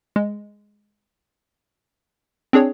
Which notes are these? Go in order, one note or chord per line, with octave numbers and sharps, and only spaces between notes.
G#3
C4 D4 G#4 C#5